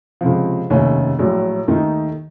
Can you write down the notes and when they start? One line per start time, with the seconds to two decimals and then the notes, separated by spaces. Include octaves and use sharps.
0.21 C#2 C3 F3
0.70 F1 D#2 C#3 A3 C#4
1.19 A#1 A2 F#3 A3
1.67 D#2 D#3 A3 D#4